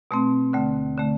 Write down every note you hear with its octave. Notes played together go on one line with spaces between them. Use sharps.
B2 A3 C4
D2 D3 A3
D3 A3